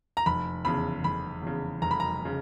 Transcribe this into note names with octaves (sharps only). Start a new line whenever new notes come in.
A#5
F1 B5
E2 C#3 B5
F1 B5
E2 C#3
F1 A#5
B5
A#5
C#3